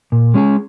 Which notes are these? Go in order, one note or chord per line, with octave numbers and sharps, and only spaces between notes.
A#2
G#3 C#4 G#4